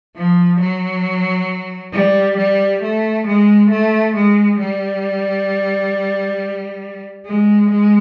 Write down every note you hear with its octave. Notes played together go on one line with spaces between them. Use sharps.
F3
F#3
G3
G3
A3
G#3
A3
G#3
G3
G#3
G#3